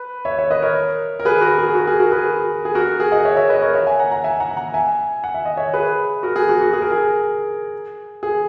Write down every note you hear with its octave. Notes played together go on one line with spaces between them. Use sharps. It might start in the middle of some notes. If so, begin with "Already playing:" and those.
Already playing: B4
C#5 E5
C#5 E5
B4 D#5
A#4 C#5
A#4
G#4 B4
F#4 A#4
G#4
G#4
F#4
A#4
G#4
F#4 A#4
G#4 B4
G#4
F#4 A#4
G#4
G#4
D#5 F#5
C#5 E5
C#5 E5
B4 D#5
A#4 C#5
C#5 E5
E5 G#5
F#5 A#5
F#5 A#5
E5 G#5
F#5 A#5
F#5 A#5
E5 G#5
F#5
E5
D#5
C#5 E5
G#4 B4
F#4 A#4
G#4
F#4
F#4
G#4
A#4
G#4
G#4